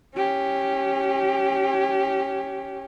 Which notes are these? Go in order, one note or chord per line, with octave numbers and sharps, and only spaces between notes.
C#4 G4